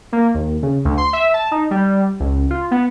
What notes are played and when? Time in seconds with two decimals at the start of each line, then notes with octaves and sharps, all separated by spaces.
0.12 A#3
0.34 D#2
0.63 C#3
0.85 D2
0.97 C6
1.13 E5
1.34 A5
1.51 D#4
1.71 G3
2.20 C#2
2.50 F4
2.71 B3